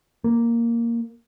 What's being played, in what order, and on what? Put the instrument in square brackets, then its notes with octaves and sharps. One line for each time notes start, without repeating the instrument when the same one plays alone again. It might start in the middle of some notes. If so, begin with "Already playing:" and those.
[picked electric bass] A#3